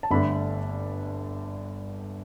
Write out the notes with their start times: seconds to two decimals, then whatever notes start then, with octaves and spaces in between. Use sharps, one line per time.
0.03 A5
0.11 G1 G2 D3 A3 D4 B5